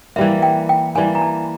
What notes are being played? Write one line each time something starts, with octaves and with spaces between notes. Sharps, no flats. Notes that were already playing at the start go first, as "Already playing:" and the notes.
E3 G3 A#3 E5
G5
G5
E3 G3 A#3 G#5
A#5
A5